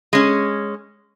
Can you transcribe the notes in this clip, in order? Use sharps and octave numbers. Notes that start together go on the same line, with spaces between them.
G#3 C#4